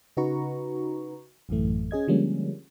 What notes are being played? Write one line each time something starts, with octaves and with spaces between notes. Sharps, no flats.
C#3 D#4 F#4 B4 A#5 C#6
A1 F#2 E3 A3
C#4 G#4 D#5 G#6
D3 F3 G3 G#3 A#3 C#4